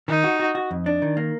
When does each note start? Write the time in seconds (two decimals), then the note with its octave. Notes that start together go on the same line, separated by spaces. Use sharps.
0.08 D#3 D#4
0.24 F#4
0.40 F#4
0.55 F#4
0.71 F2
0.86 D4
1.02 D#3
1.17 A#3